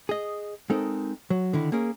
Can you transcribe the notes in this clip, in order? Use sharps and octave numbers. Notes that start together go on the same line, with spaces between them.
G#4 D#5
G#3 C4 D#4 A4 A#4
F#3
D3 D#3 E4
A#3 C#4 G#4 A#4